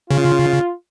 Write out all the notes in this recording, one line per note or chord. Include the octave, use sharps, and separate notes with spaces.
C#3 F4